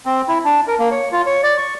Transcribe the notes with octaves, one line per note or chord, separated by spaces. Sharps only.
C4
E4
D4
A#4
A#3
C#5
F4
C#5
D5
C#6